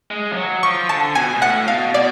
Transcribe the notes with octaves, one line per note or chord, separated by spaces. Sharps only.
G#3
F3
F#3
F3 C#6
D3 A5
B2 G#5
B2
A2 F#5
B2 F5
B2 D5